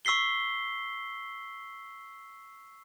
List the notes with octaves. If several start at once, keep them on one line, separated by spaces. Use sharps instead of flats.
C#6 E6 B6 C7 G7